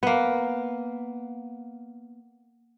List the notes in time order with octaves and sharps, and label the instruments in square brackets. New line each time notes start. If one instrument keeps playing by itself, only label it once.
[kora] A#3 B3